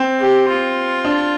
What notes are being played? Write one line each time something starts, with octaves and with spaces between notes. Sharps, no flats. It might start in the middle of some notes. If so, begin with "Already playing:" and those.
Already playing: C4
G4
F4
D4